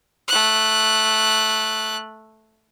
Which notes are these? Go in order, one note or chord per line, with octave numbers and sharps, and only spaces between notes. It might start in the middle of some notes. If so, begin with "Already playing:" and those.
A3 F#6